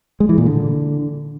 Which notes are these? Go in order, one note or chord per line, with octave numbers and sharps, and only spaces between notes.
G#3
E3
A#2
D3